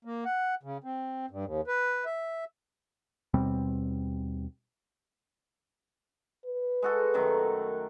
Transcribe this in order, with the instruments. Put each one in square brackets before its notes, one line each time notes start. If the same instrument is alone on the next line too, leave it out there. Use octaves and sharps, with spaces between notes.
[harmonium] A#3
F#5
C#3
C4
G2
D#2
B4
E5
[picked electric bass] D#2 B2 G3 C4
[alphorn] B4
[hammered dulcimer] G#3 F#4 A4
F#2 D#3 A3